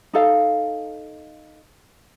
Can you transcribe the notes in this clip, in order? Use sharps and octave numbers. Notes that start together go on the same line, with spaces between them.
D#4 A4 F5